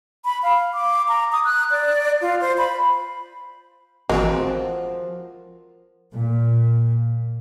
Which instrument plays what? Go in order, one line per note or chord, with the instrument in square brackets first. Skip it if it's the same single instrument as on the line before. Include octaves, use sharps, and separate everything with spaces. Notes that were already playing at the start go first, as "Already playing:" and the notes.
[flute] B5
F5
D6
A#5
D#6
F#6
D5
F4
C5
B5
[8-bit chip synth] G#1 E3 C4 [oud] F3 F#4 [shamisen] G#3 [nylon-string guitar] A#4
[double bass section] A#2